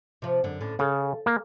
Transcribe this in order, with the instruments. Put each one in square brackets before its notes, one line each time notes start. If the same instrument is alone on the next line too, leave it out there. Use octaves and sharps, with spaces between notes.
[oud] C3 F3
F#2 D3
A2 D3 C#4
[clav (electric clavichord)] C#3 [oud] A4
[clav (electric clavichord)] A#3